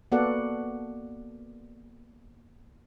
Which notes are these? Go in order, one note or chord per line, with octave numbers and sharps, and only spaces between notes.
A#3 B3 F#4 A4 D5 F#5